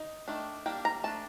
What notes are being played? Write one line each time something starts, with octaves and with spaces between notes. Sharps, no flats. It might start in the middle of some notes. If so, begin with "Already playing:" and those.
Already playing: D#4
D#3 A3 D4
G3 A#3 D4 G5
A#5
A3 D4 A5